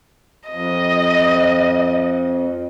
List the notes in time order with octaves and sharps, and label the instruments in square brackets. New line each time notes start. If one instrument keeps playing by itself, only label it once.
[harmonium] F2 [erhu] D#5